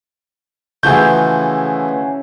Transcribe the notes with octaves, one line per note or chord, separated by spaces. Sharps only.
C#3 E3 F3 A3 E4 F#4 G#4 G6